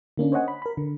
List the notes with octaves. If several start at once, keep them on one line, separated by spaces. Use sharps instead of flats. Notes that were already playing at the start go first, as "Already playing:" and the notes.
D3 A#3 C#4 D4
C5 C#5 D#5 F#5 G#5
B5
A#4 B5
D3